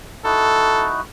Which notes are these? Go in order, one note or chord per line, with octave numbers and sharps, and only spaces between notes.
D#4 E4 F#4 A4